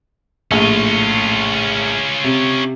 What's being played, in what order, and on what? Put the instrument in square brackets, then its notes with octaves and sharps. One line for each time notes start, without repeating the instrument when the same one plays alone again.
[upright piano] A#1 A2 [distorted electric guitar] C#4 F4
[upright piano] C3